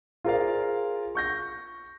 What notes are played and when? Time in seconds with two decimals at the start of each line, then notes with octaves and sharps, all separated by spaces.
0.24 F4 G#4 A#4 C5 D5 F5
1.15 C#6 G6 A#6